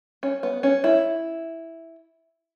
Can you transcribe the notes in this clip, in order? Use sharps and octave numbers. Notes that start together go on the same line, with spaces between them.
C#4
B3
C#4
E4